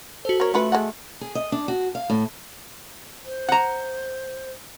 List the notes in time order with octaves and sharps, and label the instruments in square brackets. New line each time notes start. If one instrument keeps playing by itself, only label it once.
[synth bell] F#4 C5 [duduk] A4
[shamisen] A#3 C#5 [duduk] A#4
[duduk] A3 [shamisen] C#4 F4 B4 [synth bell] F#4 C6
[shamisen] G#3 A4 F#5
[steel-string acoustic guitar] G#4
D#5
D4
F#4
F5
A2
[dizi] C5
[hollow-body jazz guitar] F#5 A#5